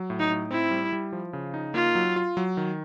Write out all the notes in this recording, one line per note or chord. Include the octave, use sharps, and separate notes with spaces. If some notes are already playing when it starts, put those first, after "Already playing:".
Already playing: F#3
A2
D#4
A2
C4 E4
G3
G3
F3
C#3
D#4
A#3 F4
F#3
F4
F#3
D#3